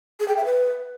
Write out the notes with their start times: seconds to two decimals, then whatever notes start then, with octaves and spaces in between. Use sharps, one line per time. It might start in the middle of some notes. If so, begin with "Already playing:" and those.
0.20 G#4
0.28 G5
0.37 E5
0.45 B4